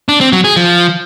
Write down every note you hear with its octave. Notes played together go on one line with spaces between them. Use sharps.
D4
C4
F#3
G#4
F3